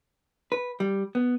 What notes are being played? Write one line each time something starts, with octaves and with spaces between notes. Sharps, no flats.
B4
G3
B3